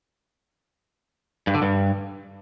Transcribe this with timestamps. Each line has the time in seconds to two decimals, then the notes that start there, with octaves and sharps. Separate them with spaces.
1.47 G2
1.55 D3
1.62 G2